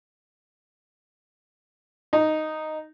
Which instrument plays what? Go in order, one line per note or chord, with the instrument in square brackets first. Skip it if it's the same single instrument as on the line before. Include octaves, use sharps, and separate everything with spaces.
[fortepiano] D#4